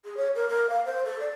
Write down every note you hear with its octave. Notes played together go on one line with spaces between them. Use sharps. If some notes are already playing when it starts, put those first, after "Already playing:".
G#4
C#5
A#4
A#4
F5
C5
A4
D5